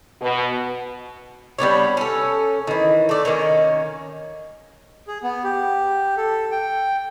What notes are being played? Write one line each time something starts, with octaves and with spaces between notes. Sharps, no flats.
B2
G3 B3 D4 C#5
C#4 A4
D#3 E3
A3 D5
D#3 A#3 C#4
G#4
B3
G4
A4
G5